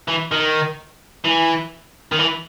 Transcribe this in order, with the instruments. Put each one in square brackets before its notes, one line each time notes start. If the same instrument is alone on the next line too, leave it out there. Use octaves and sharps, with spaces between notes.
[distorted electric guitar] E3
D#3
E3
D#3
E3